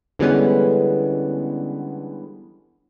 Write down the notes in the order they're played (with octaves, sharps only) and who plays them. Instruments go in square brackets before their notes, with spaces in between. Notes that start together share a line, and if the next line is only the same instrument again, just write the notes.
[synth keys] D3 E3 G3 G#3 B3 C#4